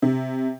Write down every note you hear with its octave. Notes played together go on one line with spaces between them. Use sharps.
C3